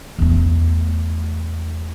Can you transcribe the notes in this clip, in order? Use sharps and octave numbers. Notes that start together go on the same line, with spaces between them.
E2 A3